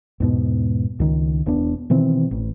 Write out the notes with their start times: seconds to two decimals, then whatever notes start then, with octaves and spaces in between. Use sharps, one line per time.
0.20 E2 G#2 B2
1.00 C#2 D#3
1.46 E1 E2 B3 D4
1.90 B2 D#3 E3 C4
2.31 A1